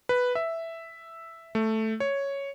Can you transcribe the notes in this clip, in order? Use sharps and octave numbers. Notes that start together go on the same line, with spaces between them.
B4
E5
A3
C#5